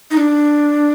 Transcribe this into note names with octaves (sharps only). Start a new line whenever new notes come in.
D#4
D4